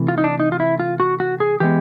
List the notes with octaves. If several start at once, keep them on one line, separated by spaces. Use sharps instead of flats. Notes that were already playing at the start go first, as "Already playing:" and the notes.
Already playing: C3 E3 A3
F4
D#4
D4
D#4
F4
E4
F4
F#4
F#4
G#4
E3 G#3 B3 G4